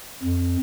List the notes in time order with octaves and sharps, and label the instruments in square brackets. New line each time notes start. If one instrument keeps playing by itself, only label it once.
[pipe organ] F2